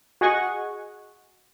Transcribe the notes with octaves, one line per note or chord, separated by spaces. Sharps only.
F#4 G#4 D#5 F#5 G#5 C#6